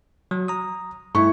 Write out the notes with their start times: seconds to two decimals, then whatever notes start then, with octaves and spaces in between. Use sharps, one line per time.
0.31 F#3
0.48 A#5 D#6
1.15 G2 A3 E4 C#6